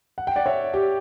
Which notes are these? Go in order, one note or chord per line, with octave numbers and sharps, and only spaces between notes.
F#5
G5
D5 F#5
C#5 E5
G4